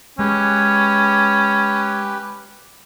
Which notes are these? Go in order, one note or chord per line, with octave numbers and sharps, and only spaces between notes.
G#3 C#4 G4 B4